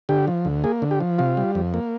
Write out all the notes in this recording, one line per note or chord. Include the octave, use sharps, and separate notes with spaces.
D3 G4
F3
D2
A#3 G#4
D3
G4
F3
C3 F4
G3
F2
A#3